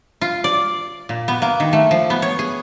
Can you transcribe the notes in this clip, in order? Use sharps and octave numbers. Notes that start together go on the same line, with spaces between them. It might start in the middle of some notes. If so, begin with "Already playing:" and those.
F4
D5
A#2
B3
A#3
D#3
A3
F3
B3
C#5
G#4